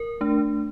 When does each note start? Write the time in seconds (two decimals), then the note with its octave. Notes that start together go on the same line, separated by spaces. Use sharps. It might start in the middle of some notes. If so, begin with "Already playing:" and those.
Already playing: A#4
0.21 A3 D4